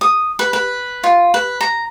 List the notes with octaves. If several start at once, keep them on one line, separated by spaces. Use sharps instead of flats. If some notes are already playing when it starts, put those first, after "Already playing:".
D#6
B4
B4
F4
B4
A#5